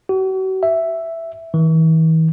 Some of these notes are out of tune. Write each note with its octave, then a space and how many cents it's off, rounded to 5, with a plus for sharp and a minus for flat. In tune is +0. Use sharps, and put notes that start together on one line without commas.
F#4 +40
E5 +5
E3 -45